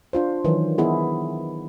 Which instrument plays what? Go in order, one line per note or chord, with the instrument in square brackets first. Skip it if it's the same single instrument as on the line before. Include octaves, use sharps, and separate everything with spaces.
[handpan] D4 F4 C5
D#3 E3 F#3
B3 E4 G#4